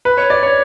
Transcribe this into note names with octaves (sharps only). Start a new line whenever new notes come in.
B4
C#5
D5
C#5